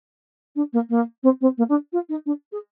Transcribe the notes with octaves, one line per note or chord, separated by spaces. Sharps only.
D4
A#3
A#3
C4
C4
A#3
D4
F4
D#4
D4
G#4